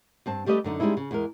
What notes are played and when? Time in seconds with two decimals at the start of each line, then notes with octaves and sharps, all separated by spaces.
0.26 G2 C4 A5
0.46 G3 A3 G4 B4 D#5
0.64 F#2 D3 D#4
0.80 G3 G#3 C4 C#4 D#4 E4
0.97 C#3
1.11 E2 G#3 A#4